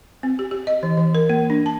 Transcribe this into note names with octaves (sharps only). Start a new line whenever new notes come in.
C4
G4
G4
D#5
E3
E3
A#4
A#3
D4
A5